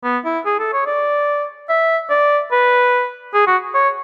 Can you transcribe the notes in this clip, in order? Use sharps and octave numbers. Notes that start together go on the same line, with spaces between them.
B3
E4
G#4
A4
C#5
D5
E5
D5
B4
G#4
F#4
C#5